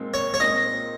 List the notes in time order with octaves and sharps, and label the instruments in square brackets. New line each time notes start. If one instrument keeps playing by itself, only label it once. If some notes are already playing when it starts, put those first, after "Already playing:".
Already playing: [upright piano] A#2 G#3 C4 D#4
[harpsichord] C#5
C#5
[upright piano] A#2 G#3 C4 D#4 [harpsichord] D#5